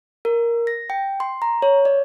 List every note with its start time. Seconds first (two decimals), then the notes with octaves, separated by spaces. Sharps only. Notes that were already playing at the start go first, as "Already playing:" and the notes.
0.25 A#4
0.67 A#6
0.90 G5
1.20 C6
1.42 A#5
1.62 C#5
1.85 D5